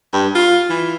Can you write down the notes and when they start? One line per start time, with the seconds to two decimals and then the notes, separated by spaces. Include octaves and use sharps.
0.13 G2
0.35 F4
0.70 E3